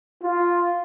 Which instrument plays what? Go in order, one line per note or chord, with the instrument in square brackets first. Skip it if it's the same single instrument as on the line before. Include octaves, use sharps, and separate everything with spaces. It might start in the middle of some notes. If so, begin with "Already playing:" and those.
[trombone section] F4